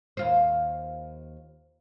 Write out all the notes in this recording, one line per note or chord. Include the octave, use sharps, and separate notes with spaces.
D#2 F4 C5